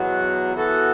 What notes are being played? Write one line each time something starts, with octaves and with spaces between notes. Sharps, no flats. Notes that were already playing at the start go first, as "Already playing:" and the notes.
Already playing: E2 B2 F#3 B3 F#4
E3 B3 F#4 A4